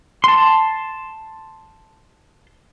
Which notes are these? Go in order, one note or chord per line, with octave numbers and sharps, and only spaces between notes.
A5 C6